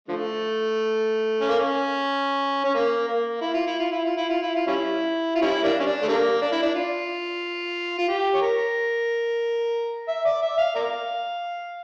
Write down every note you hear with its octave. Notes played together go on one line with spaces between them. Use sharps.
D3 F3 A3
C#4
A#3
C#4
C#4
A#3
A#3
E4
F4
E4
F4
E4
F4
E4
F4
E4
F4
G3 C#4 E4
F4
G3 C#4 E4
G3 A#3 D4
C#4
D4
A3
D3 G3 A#3
D4
E4
D4
F4
F4
G4
C#5
A#4
E5
D5
E5
F5
A#4 D5 F5